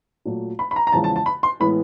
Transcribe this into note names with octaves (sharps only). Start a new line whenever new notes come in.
A#2 F#3 A3
B5
B5
A#5
A#5
E2 C#3 F3 G#3 A5
A5
A5
B5
C6
A2 E3 G#3 B3 B5